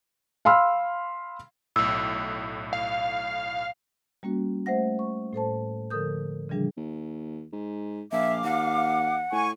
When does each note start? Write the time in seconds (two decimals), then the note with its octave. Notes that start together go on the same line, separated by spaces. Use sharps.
0.45 F5 B5 C6 E6 F6
1.76 B1 A2 E6
2.73 F5
4.23 G3 A#3 C#4 F#4
4.66 A3 C5 E5 F#5 A#6
4.99 C#6
5.33 A2 A4 C5 A5
5.90 D3 F3 A4 A#4 D#6 G6
6.49 C#3 E3 F3 G3 D4 G#4
6.77 D#2
7.52 G#2
8.12 A#1 E5 F5 D6
8.44 D#2 F#5
9.32 A2 G#5 C#6